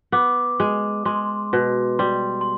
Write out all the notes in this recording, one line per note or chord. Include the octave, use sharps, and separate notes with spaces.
B3 D6
G#3
G#3 C6
B2
G3 C6
C6